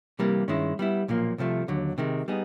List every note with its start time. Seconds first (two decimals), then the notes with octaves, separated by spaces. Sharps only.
0.19 C3 E3 G3 A#3
0.48 G2 D#3 G#3 C#4 E4
0.79 G3 B3 E4
1.08 B1 A#2 F3 A#3
1.38 C2 C3 F3 A3
1.68 D#2 D3 F#3
1.98 C3 D#3 G#3
2.28 G3 B3 D#4 G#4